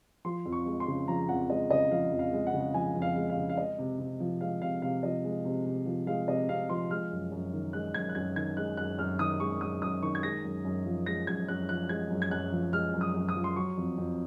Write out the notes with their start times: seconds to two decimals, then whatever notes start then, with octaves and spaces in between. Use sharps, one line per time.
0.25 F3 C6
0.45 F2
0.52 C#6
0.66 G#3
0.80 C6
0.87 C#3
1.08 F3 A#5
1.29 F2 F#5
1.50 G#3 D#5
1.70 C#3 D#5
1.91 F3 F5
2.12 F2
2.19 F5
2.33 G#3
2.47 F#5
2.54 C#3
2.74 F3 G#5
2.95 F2
3.02 F5
3.16 G#3
3.30 F5
3.37 C#3
3.49 F5
3.57 G#3 D#5
3.79 C3
3.99 C3
4.20 F3
4.41 G#3 F5
4.62 C3 F5
4.82 C3 F5
5.03 F3 D#5
5.24 G#3
5.45 C3
5.65 C3
5.86 F3
6.07 G#3 F5
6.28 C3 D#5
6.49 C3 F5
6.70 F3 C6
6.90 G#3 F6
7.11 F#2
7.32 F#2
7.53 D#3
7.73 G#3 F#6
7.94 F#2 G#6
8.09 F#6
8.15 F#2 G#6
8.36 D#3 G#6
8.57 G#3 F#6
8.77 F#2 F#6
8.99 F#2 F6
9.19 D#3 D#6
9.40 G#3 C#6
9.61 F#2 D#6
9.82 F#2 D#6
10.02 D#3 C#6
10.15 G#6
10.23 G#3 A#6
10.44 F#2
10.65 F#2
10.86 F3
11.06 G#3 A#6
11.27 F#2 G#6
11.48 F#2 F#6
11.69 F3 F#6
11.89 G#3 G#6
12.10 F#2
12.22 G#6
12.31 F#2 F#6
12.52 F3
12.73 G#3 F6
12.94 F#2
13.01 D#6
13.14 F#2
13.29 D#6
13.35 F3
13.44 C6
13.56 F#3 C#6
13.77 F2
13.98 F2